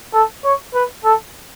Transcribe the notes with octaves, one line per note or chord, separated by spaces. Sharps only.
A4
C#5
B4
A4